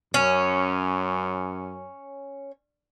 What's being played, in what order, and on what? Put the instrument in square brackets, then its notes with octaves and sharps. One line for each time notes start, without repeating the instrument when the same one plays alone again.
[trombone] F#2 [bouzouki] C#4